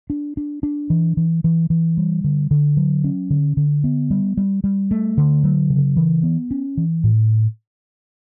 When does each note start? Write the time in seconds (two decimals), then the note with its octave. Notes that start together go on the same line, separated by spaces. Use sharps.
0.10 D4
0.37 D4
0.63 D4
0.90 E3
1.17 E3
1.44 E3
1.70 E3
1.97 G3
2.24 D3
2.51 D3
2.77 F#3
3.04 C#4
3.30 D3
3.57 D3
3.84 B3
4.11 G3
4.37 G3
4.64 G3
4.91 A3
5.18 D3
5.44 F#3
5.70 C#3
5.97 E3
6.23 B3
6.51 C#4
6.77 E3
7.04 A2